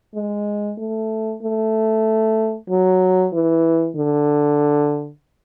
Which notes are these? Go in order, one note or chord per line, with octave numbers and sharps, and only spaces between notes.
G#3
A3
A3
F#3
E3
D3